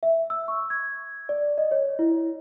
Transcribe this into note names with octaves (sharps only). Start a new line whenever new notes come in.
E5
E6
C#6
G#6
D5
D#5
C#5
E4